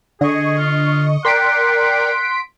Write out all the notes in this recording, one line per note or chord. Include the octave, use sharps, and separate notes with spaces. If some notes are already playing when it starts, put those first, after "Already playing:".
D3 G#4 D#5 C#6
F4
A#4 D5 F#5 G5 C6 B6 D7